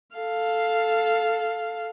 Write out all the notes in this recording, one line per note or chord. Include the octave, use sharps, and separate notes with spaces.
A4 F5